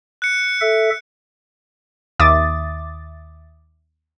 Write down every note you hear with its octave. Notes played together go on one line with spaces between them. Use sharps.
F#6 C#7
A4 E5
D#2 E5 D6 D#6 A6